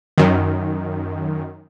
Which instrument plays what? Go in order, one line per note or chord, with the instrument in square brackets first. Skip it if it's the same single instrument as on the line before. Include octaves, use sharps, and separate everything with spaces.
[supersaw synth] F#2 D#3